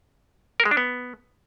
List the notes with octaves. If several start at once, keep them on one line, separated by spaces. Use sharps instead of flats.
A#4
G#3
D4
B3